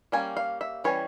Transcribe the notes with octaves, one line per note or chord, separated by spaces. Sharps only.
G3 A#3 C#4 G#5
F5
E5
E3 G3 C#4 C#5